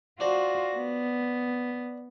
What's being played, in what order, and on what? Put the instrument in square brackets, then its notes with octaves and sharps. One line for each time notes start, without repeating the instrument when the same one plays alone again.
[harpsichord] D4 C5 [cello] F4 F#4
[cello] B3